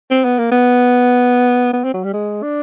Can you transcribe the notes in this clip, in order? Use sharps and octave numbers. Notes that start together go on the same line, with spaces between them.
C4
B3
A#3
B3
B3
C4
F#3
G3
G#3
D4